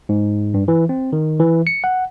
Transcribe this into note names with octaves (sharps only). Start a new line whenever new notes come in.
G#2
G2
E3
C4
D#3
E3
C#7
F#5